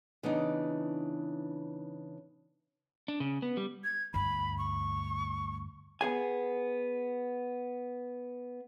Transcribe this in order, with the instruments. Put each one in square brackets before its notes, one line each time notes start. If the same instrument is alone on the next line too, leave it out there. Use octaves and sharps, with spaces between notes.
[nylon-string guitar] C#3 E3 B3 D4 D#4
[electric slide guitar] D4
C#3
B3
G3
[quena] G#6
[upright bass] D2 G2 [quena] B5
[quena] C#6
[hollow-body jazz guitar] B3 G#4 G#5